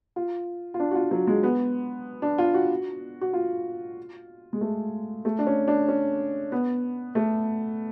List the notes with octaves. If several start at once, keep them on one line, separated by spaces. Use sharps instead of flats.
F4
F4
D4
F#4
F4
F#3
G#3
B3
D4
F4
F#4
F#4
F4
G#3
A3
A3
D4
C#4
D4
C#4
B3
A3